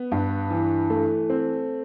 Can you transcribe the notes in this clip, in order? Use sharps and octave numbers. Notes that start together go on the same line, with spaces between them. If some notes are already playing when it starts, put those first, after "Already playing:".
Already playing: B3
G2
E3
A3
C4